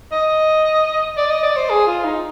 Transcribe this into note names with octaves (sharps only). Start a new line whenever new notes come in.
D#5
D5
D#5
D5
C5
G#4
F4
D#4